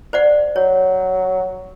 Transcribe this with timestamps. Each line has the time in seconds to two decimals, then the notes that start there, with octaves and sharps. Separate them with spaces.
0.13 C5 D5 F#5
0.56 F#3 C#5